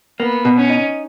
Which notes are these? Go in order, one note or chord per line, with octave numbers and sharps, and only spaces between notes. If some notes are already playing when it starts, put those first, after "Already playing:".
A#3 B3
B2
C#4
D#4